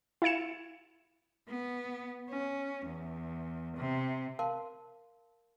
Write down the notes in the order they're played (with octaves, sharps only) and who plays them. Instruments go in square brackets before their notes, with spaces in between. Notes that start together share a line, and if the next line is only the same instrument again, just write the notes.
[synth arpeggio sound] E4 F5 G#6 C#7 E7
[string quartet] B3
C#4
E2
C3
[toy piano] A#4 F5 A5 C6